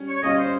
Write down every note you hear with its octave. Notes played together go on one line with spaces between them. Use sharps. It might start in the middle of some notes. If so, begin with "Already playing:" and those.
Already playing: G3 C#4
C#5
G3 C#4 F4 D#5
C5